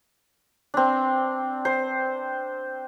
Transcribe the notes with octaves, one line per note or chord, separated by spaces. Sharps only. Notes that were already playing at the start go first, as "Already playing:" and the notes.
C4 D4
C5